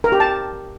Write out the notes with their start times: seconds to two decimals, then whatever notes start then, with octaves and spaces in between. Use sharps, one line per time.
0.04 A#4
0.12 G4
0.20 A5